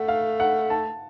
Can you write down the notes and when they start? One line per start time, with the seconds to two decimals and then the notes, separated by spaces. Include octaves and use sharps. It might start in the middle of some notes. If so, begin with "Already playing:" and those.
Already playing: A3 F#5
0.08 F5
0.40 F#5
0.70 A5